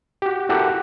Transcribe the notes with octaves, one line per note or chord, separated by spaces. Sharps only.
F#4 G4
E4 F#4 G4 A4 A#4 F#5